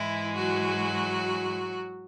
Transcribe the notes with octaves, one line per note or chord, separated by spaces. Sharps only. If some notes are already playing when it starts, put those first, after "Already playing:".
Already playing: G#2 E3 G#3 E4
F#3 F#4